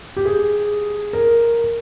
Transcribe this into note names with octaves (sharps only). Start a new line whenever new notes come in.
G4
G#4
A#4